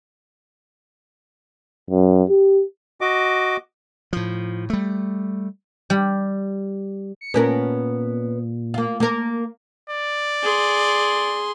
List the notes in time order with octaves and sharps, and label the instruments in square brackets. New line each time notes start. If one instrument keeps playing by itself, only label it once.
[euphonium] F#2
G4
[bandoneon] F#4 D#5 D6
[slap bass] A2 F3
G3 A3
[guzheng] G3
[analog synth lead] C#7
[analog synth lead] A#2 [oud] B3 C#4 A#4
[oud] A#3 F4
A#3 A#4
[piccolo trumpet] D5
[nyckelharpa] G#4 C6